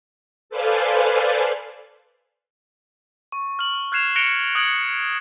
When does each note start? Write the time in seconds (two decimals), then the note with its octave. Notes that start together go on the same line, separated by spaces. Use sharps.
0.50 A4 B4 C5 D5 F5 G#5
3.32 C#6
3.59 F6 F#7
3.92 F6 F#6 G#6 C7 E7 F7
4.16 F#6 A#6 C#7 D7 F7 G7
4.55 D#6 F#6 G#6 D7 F#7